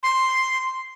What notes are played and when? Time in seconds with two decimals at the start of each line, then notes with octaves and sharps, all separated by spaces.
0.03 C6